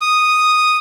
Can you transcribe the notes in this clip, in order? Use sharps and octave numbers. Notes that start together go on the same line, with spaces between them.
D#6